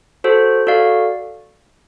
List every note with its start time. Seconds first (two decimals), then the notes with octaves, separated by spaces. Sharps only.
0.24 F#4 A4 C5
0.67 F#4 A4 D5 F5